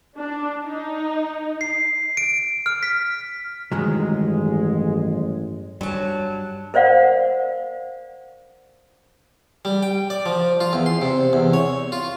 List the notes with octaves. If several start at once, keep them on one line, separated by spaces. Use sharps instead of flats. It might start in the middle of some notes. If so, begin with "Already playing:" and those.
D4
D#4
C7
D7
F6
B6
A1 G2 D#3 F#3 G#3
G2 F#3 G3 A5
A#4 C5 D5 F5 F#5
G3
G5
D5
F3
F4
E2
C6
C3
E2
C#5
F4